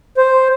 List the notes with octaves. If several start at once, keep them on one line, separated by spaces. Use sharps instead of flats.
C5